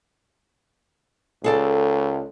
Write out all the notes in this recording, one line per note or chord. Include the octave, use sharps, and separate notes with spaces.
C#2 G#4 A4 D5